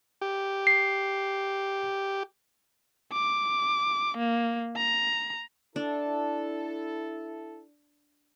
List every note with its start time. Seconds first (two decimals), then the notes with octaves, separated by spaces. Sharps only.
0.21 G4
0.67 C7
3.12 D6
4.18 A#3
4.77 A#5
5.76 D4 E4 A4